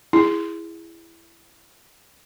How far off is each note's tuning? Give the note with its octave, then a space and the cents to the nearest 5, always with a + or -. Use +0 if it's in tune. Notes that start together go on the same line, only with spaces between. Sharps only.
E4 +15 G#4 -15